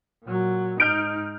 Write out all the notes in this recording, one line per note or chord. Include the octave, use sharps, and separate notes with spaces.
A#2 F#3
G#2 D#4 F6 G6 D7